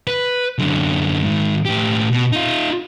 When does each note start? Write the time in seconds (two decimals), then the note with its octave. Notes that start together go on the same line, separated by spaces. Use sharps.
0.07 B4
0.59 F#2 D3
1.23 G#2 D#3
1.65 A2 G4
2.12 B2
2.32 D#4 F4